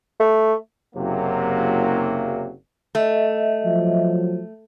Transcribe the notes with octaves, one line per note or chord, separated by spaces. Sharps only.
A3
F#1 C3 F#3 A#3
A3 D#5 E5
F3 F#3